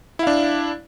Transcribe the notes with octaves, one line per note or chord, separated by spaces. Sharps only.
D4 E4 F5